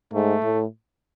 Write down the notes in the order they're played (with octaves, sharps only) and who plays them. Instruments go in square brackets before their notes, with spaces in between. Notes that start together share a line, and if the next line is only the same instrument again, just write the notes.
[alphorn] G#2 [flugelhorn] A3
[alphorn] A2